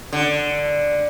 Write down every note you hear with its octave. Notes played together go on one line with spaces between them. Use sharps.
D3